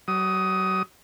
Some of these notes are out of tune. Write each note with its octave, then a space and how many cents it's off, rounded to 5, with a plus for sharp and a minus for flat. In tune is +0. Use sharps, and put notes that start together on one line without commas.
F#3 +35 D#6 +10